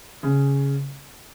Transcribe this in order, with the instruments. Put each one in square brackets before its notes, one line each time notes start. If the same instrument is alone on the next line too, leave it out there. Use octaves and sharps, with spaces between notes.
[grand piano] C#3